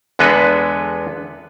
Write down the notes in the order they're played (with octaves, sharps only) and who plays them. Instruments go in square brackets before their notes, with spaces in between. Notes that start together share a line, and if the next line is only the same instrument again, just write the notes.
[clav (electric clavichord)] E2 D3 G#3 B3 A4 B4